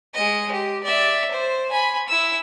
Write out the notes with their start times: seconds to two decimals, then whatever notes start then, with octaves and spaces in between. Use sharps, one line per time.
0.14 G#3 D#5
0.52 G4
0.84 D5 E5
1.31 C5
1.71 G#5 B5
2.08 E4 E6